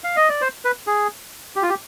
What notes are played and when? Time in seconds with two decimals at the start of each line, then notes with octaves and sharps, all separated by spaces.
0.04 F5
0.16 D#5
0.29 D5
0.41 C5
0.65 B4
0.87 G#4
1.56 G4
1.63 F4
1.70 G4